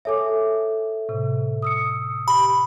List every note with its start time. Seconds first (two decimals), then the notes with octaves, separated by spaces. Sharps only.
0.05 A4 C#5 E5 G#5 D6
1.09 A2 C3
1.62 D#6 E6 C#7
2.28 G4 B5